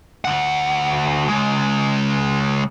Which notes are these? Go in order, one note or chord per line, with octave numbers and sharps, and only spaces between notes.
D2 F#5
C#3 G#3